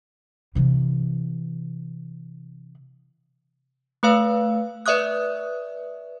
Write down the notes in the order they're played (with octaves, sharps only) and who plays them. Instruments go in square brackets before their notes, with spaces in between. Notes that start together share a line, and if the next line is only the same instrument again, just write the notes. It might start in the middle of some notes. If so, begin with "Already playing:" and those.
[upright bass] C3 E3
[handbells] A3 B4 F5 E6
B4 D5 E5 C#6 D#6 F#6